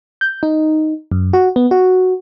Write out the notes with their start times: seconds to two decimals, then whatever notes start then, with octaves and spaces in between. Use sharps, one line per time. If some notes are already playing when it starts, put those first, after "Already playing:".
0.21 G6
0.43 D#4
1.12 F#2
1.33 F#4
1.56 B3
1.71 F#4